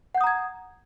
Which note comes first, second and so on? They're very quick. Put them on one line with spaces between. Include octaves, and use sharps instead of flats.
F#5 G6 D#6 A#5 G#6